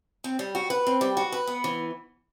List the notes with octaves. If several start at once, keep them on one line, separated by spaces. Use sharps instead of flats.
C4
G3
F#4
B4
C4
G3
F#4
B4
B3
E3